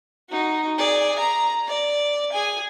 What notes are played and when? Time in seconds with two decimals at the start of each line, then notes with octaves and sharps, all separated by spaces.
0.29 D#4 F#4
0.78 G#4 D5
1.19 A#5
1.68 D5
2.32 G#4 G#5